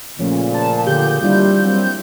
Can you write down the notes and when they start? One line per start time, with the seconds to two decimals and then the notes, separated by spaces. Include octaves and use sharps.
0.19 A#2 C#3 F3 A3 C#4
0.54 A5
0.87 D3 G4 G#4 G6
1.22 D#2 G3 D4 E4 F4
1.62 F#3 A#3 C4